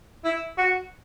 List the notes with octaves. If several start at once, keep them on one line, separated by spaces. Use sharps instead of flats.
E4
F#4